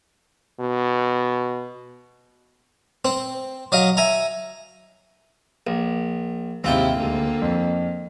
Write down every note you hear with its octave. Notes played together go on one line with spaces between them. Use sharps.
B2
C4
F#3 D#5 F5
E5 G#5 A#5
A#1
D#2 G#2 C3 C4 E4 F4 G5
D2 D3 G#3 A#3
F2